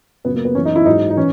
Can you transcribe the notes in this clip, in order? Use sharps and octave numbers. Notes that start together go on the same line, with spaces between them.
F#2 C#3 F#3 B3
A#3
B3
F#2 E3 C#4
D#4
E4
G#2 F#3 D#4
D#4
E3 C#4